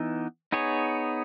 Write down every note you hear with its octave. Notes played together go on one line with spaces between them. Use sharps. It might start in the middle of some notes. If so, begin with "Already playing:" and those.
Already playing: E3 B3 D#4
B3 D#4 G#4 C#5